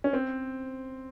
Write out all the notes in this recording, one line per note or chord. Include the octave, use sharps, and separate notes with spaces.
C#4
C4